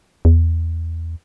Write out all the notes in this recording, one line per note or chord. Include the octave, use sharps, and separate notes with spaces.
E2